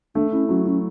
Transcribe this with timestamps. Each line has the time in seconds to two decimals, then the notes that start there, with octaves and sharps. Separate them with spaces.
0.15 A3 D4
0.32 C#4 E4
0.49 F#3 C#4
0.66 F#3 C#4